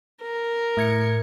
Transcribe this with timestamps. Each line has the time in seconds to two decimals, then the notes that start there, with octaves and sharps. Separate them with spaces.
0.22 A#4
0.77 A2 G#6 C#7